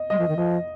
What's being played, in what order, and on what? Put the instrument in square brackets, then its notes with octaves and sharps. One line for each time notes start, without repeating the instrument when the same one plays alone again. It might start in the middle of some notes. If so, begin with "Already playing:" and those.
Already playing: [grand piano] D#5
[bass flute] G3 [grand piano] D#5
[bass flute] F3
D#3
[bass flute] F3 [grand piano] D#5